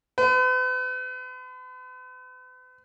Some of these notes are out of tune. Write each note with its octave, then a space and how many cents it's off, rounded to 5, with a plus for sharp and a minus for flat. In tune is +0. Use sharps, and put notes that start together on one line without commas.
B4 +45